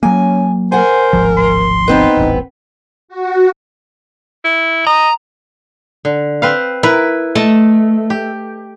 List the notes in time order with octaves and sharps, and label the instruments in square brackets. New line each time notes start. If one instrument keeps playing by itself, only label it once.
[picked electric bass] F#3 A#3 [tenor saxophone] C#4 [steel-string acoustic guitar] G#5
[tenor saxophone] A#4 [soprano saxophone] C5 [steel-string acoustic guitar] F#5 G#5
[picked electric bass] D1 G#1 F3
[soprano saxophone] C6
[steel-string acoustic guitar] B3 C4 B4 [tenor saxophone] D#4
[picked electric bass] D#1 A1
[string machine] F#4
[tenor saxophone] E4
[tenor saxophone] D#5 [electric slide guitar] A#5
[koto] D3
C4 B4 F5
[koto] E4 B4 [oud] A#4
[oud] A3 [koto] D#5 A5
[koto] G4